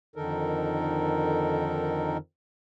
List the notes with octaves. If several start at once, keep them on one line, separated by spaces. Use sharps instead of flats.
F2 D3 D#3 D#4 A4 A#4